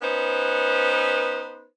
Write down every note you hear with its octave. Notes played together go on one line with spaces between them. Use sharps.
B3 C#4 D#4 B4 C5